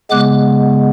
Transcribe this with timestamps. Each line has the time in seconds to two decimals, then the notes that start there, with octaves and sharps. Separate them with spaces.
0.10 C#3 G#3 B3 D6 F#6